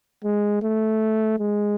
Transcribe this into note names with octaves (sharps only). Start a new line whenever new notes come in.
G#3
A3
G#3